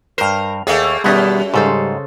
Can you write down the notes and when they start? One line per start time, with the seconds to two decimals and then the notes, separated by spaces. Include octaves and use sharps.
0.18 G2 A#4 C5
0.67 D#2 A3 A#3 G#4
1.04 F#2 B2 D#3 G3 B3 D#5
1.54 G#2 C#3 G3 A4 C5